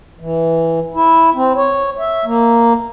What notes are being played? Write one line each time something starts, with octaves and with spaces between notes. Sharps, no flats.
E3
E4
C4
C#5
E5
A#3